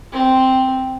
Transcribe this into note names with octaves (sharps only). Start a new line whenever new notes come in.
C4